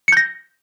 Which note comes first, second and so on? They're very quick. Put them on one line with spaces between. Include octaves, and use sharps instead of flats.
C#7 G6 A#6